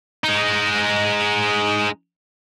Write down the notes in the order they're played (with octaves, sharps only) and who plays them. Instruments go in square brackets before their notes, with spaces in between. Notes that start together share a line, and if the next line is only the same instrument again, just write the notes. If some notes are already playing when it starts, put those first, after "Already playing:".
[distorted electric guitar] G#3 D#4